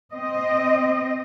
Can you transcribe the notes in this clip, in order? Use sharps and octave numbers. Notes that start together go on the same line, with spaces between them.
C4 D#5